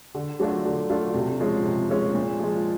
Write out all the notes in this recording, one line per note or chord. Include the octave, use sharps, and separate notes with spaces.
D3
F#3 A3 D4 F4
D3
F#3 A3 D4 F4
C3
F3 G#3 C#4
C3
F3 G#3 C#4
A#2
F3 G#3